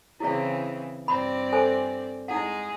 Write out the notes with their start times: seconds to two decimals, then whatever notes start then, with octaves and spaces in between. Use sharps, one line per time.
0.20 C#3 E3 C4 E4 G#4 D5
1.08 G2 C4 D5 B5
1.52 A4 C5 G#5
2.28 G#3 D#4 E4 G#4 F#5